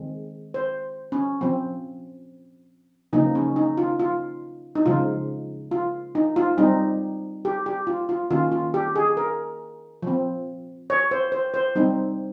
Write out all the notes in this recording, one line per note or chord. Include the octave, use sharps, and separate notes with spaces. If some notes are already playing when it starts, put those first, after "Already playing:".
Already playing: D#3 G#3 C4
C5
C#4
F3 C4
C#3 F3 A#3 D#4
C#4
D#4
F4
F4
D#4
C#3 F3 G#3 F4
F4
D#4
F4
G3 C4 D#4
G4
G4
F4
F4
D#3 A#3 C#4 F4
F4
G4
G#4
A#4
F3 C4
C#5
C5
C5
C5
G3 C4 D#4